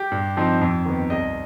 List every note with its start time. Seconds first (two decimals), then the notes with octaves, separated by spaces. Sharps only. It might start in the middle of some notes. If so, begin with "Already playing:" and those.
Already playing: G4
0.12 G2
0.37 F3 C4 D#4
0.61 F2
0.85 D#3 B3
1.10 C2 D#5